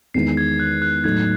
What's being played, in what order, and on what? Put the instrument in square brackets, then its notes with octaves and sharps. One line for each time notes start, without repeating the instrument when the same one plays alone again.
[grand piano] E2 D#3 G#3 [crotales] C7
[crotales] G#6
F#6
F#6
[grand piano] A2 F#3 A3 D#4 [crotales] G#6